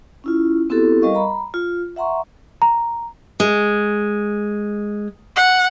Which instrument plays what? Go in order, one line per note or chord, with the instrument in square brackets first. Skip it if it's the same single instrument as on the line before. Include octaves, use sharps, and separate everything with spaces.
[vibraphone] C#4 E4 F4
B3 C4 E4 F#4 G4 A4
G3 A#4 D#5 F5 C#6
A#5 B5
F4
E5 F#5 A#5 C6 C#6
[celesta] A#5
[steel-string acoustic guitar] G#3
[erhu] F#5